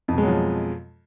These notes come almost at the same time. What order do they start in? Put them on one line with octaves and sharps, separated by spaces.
F2 B2 G#3 F#3 F3